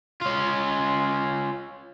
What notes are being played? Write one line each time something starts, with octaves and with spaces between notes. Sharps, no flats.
C#4 F4